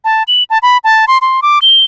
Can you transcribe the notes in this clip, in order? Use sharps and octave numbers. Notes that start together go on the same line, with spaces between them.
A5
F#7
A5
B5
A5
C6
C6
D6
G7